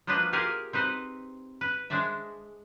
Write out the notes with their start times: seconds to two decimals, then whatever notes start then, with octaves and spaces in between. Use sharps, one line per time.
0.07 F3 A#3 B3 D4 B4 D#5
0.33 F4 G4 G#4 A#4 D#5
0.73 C4 D#4 B4 C5
1.61 B4
1.90 G#3 D4 C5 D5 E5